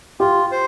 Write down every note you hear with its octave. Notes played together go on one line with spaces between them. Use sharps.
F4 G4
C5